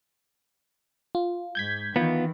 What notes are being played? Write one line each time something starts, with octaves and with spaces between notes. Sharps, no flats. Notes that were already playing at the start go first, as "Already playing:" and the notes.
F4
G#2 G6 G#6 B6
D#3 E3 B3 F4